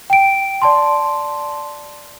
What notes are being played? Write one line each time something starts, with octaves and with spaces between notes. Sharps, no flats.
G5 D7
D5 A5 C6